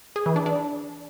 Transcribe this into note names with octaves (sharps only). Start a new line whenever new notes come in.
G#4
E3
D4
D4